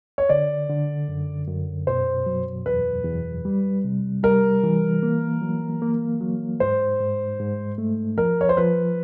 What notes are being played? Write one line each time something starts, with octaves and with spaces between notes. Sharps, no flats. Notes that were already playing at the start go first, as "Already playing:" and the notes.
C#5
D3 D5
D3
F#2
F#2
B2 C5
F#3
E2 B4
E2
G3
C3
G3 A#4
E3
A#3
F#3
A#3
F#3
G#2 C5
G#2
G#2
A3
F3 A#4
C#5
C5
F3 B4